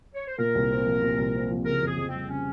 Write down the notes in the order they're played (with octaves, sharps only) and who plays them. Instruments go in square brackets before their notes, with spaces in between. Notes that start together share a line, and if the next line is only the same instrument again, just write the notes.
[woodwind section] C#5
C5
[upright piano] A#2 [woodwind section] A#4
[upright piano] C2
C4
F3
A#2
C2
C4
F3
[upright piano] C#3 [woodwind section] A#4
[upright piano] F2 [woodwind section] G#4
[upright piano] F2
[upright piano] G3 [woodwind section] C4
[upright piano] C#3 [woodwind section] C#4